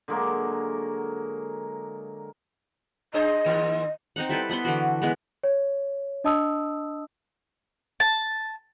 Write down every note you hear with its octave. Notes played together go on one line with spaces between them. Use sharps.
D3 F#3 G#3 A#3
D4 G#4 C5 D#5
G#2 D#3 A#3
C4 D#4 F#5
G3 E4 A4 B4
B3 F#5 B5 C6
D3 E3 F#4
E3 G#3 B3
C#5
D4 D#5 A5 D#6 E6
A5